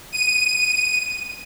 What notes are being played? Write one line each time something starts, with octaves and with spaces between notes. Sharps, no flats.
D#7